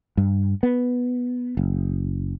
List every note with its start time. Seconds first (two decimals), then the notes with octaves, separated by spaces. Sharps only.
0.17 G2
0.63 B3
1.57 F#1